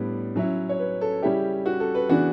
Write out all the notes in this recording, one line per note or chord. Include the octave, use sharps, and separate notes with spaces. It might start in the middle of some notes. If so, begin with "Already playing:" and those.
Already playing: A2 G3 B3 D4
F#3 C#4 E4
C#5
B4
A4
C#3 G3 C#4 E4 G4
F#4
A4
B4
C#3 E3 B3 D4 F#4